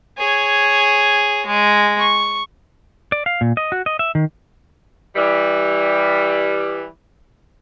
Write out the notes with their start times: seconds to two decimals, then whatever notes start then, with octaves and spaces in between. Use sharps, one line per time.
0.18 G#4 C#5
1.47 G#3
1.99 C#6
3.12 D5
3.26 F5
3.41 A#2
3.57 D#5
3.72 F#4
3.86 D#5
3.99 E5
4.15 D#3
5.16 E3 G3